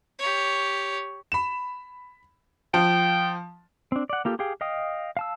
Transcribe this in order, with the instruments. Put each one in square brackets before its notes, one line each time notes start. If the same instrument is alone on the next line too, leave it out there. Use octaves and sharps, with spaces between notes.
[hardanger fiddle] G4 C#5
[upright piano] B5 E7
[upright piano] F3 [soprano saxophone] G5
[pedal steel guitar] C4 D4
D5 F#5
A#3 F4 G4 A4
G4 G#4 F5 G5
D#5 F5 G5 D#6
F5 A5 E6